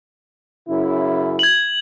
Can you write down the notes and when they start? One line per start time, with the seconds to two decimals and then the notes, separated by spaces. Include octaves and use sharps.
0.68 F#2 C#3 E4
1.39 G#6 F#7